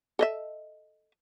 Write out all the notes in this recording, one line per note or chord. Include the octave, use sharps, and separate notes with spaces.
A4 D#5 E5